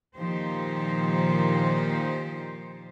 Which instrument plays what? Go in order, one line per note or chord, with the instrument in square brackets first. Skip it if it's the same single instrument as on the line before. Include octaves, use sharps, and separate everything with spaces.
[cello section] A#2 D#3 F3 D#4 G4 C5